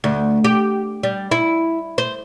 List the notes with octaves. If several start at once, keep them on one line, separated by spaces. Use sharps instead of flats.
D2
G4
G3
E4
C5